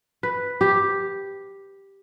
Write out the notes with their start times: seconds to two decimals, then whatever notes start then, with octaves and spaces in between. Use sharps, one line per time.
0.23 B4
0.61 G4